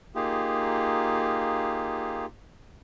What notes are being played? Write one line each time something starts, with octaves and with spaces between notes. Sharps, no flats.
A#3 D#4 F4 G4 G#4